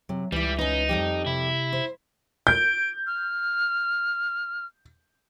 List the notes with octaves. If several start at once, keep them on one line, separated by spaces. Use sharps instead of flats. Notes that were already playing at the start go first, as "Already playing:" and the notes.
C3 F#3
C#2 E3 G3 E4
C#4 D#4 B4
F2 G3 G4
C3 E4
C5
G6 D7
F6